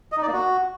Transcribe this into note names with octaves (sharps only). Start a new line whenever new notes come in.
D#5
D#4
D5
A#3
F#4